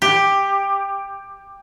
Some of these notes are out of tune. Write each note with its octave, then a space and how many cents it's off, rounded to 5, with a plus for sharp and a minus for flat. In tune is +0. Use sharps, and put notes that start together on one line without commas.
G4 +10